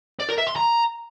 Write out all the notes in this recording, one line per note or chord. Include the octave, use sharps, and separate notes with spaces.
D5
A#4
E5
C6
A#5